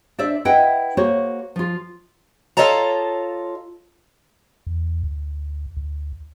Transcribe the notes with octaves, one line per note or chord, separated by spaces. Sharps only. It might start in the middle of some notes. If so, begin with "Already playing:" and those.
D4 C5 D5 E5
E4 B4 D#5 E5 F#5 G5
A#3 F#4 C5 C#5
F3 F4
F4 A4 C#5 D#5 A5 A#5
E2
D2
D2